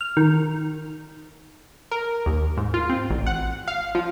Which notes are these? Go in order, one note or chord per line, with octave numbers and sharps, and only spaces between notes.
F6
D#3
A#4
D#2
G#2
F4
C4
A1
F#5
F5
F3